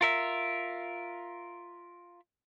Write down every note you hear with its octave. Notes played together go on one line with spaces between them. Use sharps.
F4 A#4 E5